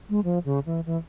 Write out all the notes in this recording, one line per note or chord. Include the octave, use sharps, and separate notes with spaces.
G#3
F3
C#3
E3
E3